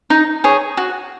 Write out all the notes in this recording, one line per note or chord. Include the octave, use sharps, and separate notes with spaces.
D#4
G#4 C#5
F#4